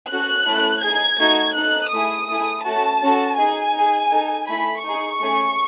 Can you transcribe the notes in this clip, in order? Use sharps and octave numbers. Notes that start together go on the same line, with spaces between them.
C#4 F#4 A4 F#6
A3 C#4 E4 A4
D#4 G#4 G#6
A3 D#4 F#4 G#6
D#4 A4 F#6
A3 E4 G#4 D#6
A3 E4 G#4
A3 C#4 F#4 A5
C#4 F#4 A4
D#4 G#4 G#5
D#4 G#4
D#4 A4
A3 E4 A4 B5
D#4 G#4 C#6
A3 C#4 G#4